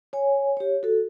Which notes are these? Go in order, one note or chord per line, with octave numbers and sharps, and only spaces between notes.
C#5 G#5
G4 C#5
F#4 A4